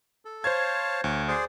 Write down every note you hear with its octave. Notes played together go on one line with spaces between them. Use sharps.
A4
C5 C#5 F5 A5 G#6
D2 C#5
G#4 C5 D5